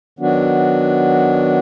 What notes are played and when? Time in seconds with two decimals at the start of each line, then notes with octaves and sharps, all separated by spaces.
0.19 D#3 F#3 B3 D4 F#4